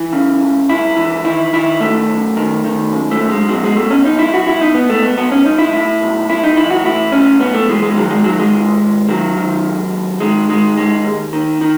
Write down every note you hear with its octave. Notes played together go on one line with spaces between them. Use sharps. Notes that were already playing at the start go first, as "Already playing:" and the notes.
Already playing: E3 E4
C#3
C#2
C#2 E4
E3
D#3 E4
D#3 E4
F#2 A3
F#2
D#3
D#3
F#2
A3
F#2
G#3
B2 F#3
G#3
B2 A3
C#4
B1 D#4
E4
B1 F#4
E4
B2 D#4
B3
B2 A3
B3
B1 B3
C#4
B1 D#4
E4
A2 E4
B1
B1 E4
D#4
E3 E4
F#4
A2 E4
B1 C#4
B1 B3
A3
E3 G#3
G#3
D#3 F#3
G#3
D#3 F#3
G#3
D#2
D#2
D#3 F#3
D#3
D#2
D#2
D#3 G#3
D#3 G#3
D#2 G#3
D#2
D#3
D#3